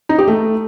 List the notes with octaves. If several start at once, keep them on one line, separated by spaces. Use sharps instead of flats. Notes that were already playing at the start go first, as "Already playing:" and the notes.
D#4
G4
A3